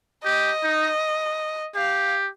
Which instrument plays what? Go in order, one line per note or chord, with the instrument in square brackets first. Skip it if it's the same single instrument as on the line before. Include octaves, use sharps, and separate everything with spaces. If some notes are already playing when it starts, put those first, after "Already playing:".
[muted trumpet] G4 [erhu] D#5
[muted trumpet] D#4
[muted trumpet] G4 [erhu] F5